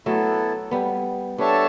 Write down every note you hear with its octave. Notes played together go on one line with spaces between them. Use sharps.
F#3 A3 B3 E4 A4
G3 B3
G3 B3 D4 A4 C#5 E5 A5